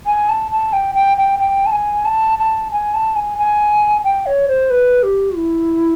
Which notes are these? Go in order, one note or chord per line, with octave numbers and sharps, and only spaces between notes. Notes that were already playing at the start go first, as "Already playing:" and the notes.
G#5
A5
A5
G5
G5
G5
G5
A5
G#5
A5
A5
G#5
A5
G#5
G#5
G5
C#5
C5
B4
G4
E4